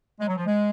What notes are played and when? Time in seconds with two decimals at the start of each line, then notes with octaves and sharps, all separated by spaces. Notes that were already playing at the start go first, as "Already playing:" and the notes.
0.20 G#3
0.27 F#3
0.36 F3
0.46 G#3